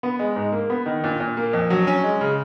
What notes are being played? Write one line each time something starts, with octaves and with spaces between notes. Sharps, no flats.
B3
G#3
G#2
A#3
B3
D#3
A#2
A#2
A#3
F2
F#3
C#4
G#3
C#3